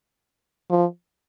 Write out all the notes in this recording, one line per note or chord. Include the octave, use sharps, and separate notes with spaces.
F3